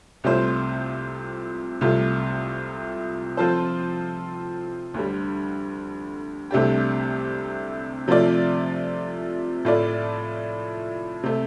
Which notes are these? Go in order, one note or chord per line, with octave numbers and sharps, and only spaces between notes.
C2 C3 A3 F4 C5
C2 C3 A3 F4
F3 C4 F4 A4 C5
D2 D3 G3
C2 C3 A3 D4 G4
C3 F3 A3 F4 D5
A2 A3 F4 D5
C3 A3